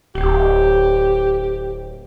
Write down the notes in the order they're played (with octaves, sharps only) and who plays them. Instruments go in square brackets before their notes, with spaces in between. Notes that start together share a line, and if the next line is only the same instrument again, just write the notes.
[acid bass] D1 [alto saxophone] G4